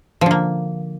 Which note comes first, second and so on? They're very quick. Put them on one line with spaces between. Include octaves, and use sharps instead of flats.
F3 D3 A#3